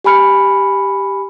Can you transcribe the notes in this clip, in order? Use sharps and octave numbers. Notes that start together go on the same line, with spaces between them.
G4 G#5 B5 F6 C#7